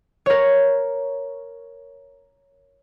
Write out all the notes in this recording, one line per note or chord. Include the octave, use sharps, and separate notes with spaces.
A#4 C#5